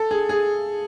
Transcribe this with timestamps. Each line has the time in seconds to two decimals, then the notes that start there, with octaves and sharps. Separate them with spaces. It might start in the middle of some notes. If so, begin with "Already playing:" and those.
Already playing: A4
0.11 G#4
0.29 G#4